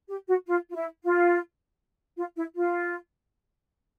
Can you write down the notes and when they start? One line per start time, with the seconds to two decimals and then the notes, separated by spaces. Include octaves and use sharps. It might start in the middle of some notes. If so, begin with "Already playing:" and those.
0.09 G4
0.28 F#4
0.47 F4
0.71 F4
0.75 E4
1.04 F4
2.17 F4
2.36 E4
2.56 F4